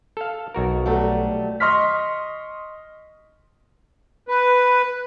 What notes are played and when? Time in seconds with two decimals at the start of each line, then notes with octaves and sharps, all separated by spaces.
0.17 A4 F5
0.55 B1 F#4 A#4
0.86 F#3 G3 A3
1.60 D#5 C6 C#6 F6 B6
4.28 B4